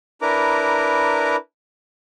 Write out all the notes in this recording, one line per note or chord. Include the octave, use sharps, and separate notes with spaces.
D4 E4 A#4 B4 A#5 D6